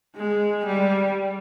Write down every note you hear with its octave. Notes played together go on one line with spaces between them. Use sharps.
G#3
G3